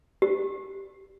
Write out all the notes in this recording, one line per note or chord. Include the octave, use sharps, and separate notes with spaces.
G4